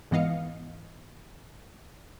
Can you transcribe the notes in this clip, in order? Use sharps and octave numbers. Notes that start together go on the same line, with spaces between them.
G#2 E3 B3 D#5 F5 C#7